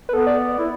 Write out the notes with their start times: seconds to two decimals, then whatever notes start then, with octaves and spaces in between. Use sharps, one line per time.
0.09 B4
0.13 B3 A4
0.27 D5
0.41 D5
0.54 E4 D5